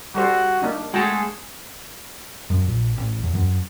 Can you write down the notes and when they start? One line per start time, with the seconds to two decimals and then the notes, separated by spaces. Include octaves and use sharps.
0.15 G3 F#4 A4 C5
0.62 A#3 D4 D#4
0.94 G#3 A3 F#4 G#4 A4 G5 A#5
2.50 F#2
2.67 A#1
2.98 A1
3.23 E2
3.35 F#2